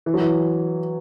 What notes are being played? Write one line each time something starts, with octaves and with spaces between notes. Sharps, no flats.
E3
F#3
E3